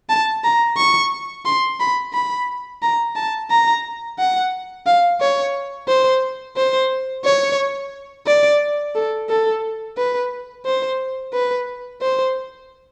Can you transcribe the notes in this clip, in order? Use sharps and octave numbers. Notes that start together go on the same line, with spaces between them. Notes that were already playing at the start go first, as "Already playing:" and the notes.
A5
A#5
C#6
C6
B5
B5
A#5
A5
A#5
F#5
F5
C#5
C5
C5
C#5
D5
A4
A4
B4
C5
B4
C5